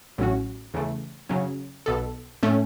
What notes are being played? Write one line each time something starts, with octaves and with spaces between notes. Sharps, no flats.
A1 A2 F#3 C#4 F#4
E2 C#3 E3 A3
F#2 C#3 F#3 C#4
B1 B2 B3 A4
A2 A3 C#4